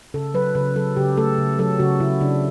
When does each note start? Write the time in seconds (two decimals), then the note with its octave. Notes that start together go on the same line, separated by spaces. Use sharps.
0.14 C#3 A4
0.34 F#3 B4
0.55 C#3 B4
0.76 F#3 A4
0.96 C#3 G4
1.17 A3 A4
1.38 C#3
1.59 F#3 A4
1.79 C#3 F#4
2.00 C#3 E4
2.21 C#3 D4